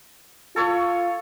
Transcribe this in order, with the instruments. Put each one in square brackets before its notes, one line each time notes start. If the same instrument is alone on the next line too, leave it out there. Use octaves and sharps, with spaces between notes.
[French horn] F4 [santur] A4 C#5